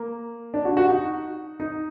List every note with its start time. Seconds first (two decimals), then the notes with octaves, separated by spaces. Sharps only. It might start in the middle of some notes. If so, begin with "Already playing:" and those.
Already playing: A#3
0.54 D4
0.65 F#4
0.77 F#4
0.89 D#4
1.60 D#4